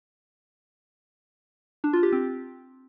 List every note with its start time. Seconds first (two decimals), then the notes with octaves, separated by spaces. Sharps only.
1.84 D4
1.93 F4
2.03 G4
2.12 C4